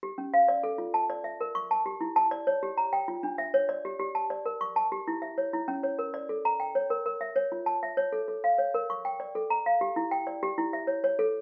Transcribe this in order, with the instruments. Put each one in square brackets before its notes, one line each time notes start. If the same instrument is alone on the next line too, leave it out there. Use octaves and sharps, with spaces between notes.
[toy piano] G4
C#4
F5
D5
A4
F4
A5
D5
E5
A#4
C#6
A5
G4
E4
A5
D5
C#5
G4
A#5
G5
F4
D4
E5
C#5
D5
G4
G4
A5
D5
A#4
C#6
A5
G4
E4
E5
C#5
E4
C#4
C#5
A#4
D5
A4
A#5
G5
C#5
A#4
A#4
E5
C#5
F4
A5
E5
C#5
A4
A4
F5
C#5
A#4
C#6
G5
D5
A4
A#5
F5
G4
E4
G5
D5
G4
E4
E5
C#5
C#5
A4